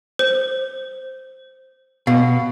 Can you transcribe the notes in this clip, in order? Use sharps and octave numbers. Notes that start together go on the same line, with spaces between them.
C5
B2 F5